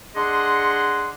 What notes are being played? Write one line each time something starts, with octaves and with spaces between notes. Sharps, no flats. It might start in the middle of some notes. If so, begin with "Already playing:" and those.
D4 G#4 D#5 F#5 C6